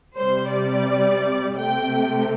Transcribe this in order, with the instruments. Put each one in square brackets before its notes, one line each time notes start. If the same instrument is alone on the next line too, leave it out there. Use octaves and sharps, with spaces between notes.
[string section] C3 G3 C5
D5
C3 A3 G5